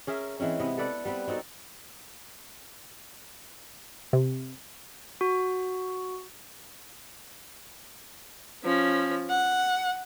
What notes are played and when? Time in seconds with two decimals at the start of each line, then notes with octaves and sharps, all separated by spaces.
0.07 C#4 G#4 A#4 E5
0.40 E3 G#3 C4 C#4
0.60 C3 B3 E4 D#5
0.78 A4 B4 D5 F#5
1.05 G3 B3 C4 B4
1.27 C4 D#4 F#4 A4
4.13 C3
5.21 F#4
8.64 F3 C#4
9.30 F#5